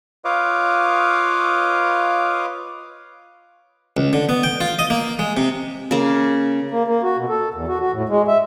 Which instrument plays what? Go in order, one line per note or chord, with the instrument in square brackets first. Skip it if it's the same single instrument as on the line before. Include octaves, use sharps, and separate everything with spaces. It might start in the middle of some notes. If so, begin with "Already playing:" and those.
[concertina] F4 B4 C#5 D#5 F5 D6
[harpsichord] C#2
D3
B3
G5
F4
D#5
A#3
G#3
C3
[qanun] C#3 A#3
[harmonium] A#3
A#3
F#4
B2
A4
E2
F#4
F#4
A2
G#3
E5